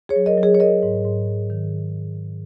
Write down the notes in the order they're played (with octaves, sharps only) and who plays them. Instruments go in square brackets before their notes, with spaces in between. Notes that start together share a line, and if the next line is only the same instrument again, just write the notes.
[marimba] G#4 C#5
F#3
A#4 D#5
F#3
G#4 C#5
C#5
F#3 A#4 D#5
G#2
G#2
F#3
D#3